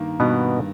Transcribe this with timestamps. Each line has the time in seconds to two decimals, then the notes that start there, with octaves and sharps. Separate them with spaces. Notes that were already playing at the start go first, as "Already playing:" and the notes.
Already playing: G2 D#3 A#3
0.20 G2 B2 B3